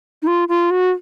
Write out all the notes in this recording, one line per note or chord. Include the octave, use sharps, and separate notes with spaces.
D#4
F4
F4
F#4